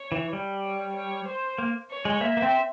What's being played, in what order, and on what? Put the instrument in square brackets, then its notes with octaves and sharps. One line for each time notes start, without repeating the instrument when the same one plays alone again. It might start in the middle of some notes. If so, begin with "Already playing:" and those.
Already playing: [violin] C#5
[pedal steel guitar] E3
G3
[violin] C#5
C#5
C5
[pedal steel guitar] A#3
[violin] C#5
[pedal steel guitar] G#3
[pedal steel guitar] A#3 [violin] E5
[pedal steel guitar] A#3
C4